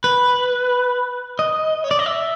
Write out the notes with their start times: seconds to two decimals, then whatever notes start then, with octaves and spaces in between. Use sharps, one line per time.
0.04 B4
1.39 D#5
1.84 C#5
1.91 D5
1.99 D#5
2.06 E5